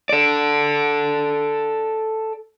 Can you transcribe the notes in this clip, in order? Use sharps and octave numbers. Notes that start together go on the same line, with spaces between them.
A4 D5